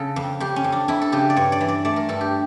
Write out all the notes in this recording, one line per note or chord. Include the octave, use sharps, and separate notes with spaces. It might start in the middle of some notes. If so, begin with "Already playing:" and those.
Already playing: C#3 A4
F2
F2 G4
C#4
F2
D4
F2 E4
A4
C#3 G4
D5
G2 C#5
D5
E3
D5
A3 D5
A#4
G2 A4
G4